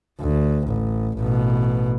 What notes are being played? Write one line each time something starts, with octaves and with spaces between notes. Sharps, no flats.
D2
A1
A1 B2